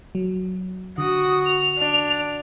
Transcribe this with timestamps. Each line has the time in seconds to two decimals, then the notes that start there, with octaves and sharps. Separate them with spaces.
0.15 F#3
0.98 D3 F#4 D#6
1.45 F7
1.79 D4